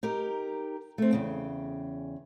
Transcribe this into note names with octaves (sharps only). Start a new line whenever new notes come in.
D#4 G4 A#4
A3 C4
E2 C#3 G5